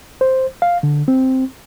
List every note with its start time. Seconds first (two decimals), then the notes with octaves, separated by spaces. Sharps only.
0.21 C5
0.62 F5
0.83 D3
1.08 C4